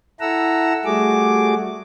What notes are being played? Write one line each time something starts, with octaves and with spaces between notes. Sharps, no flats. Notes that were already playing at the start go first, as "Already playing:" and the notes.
E4 A4 F#5 A#5 E6
G3 A3 F#4 G#4 D6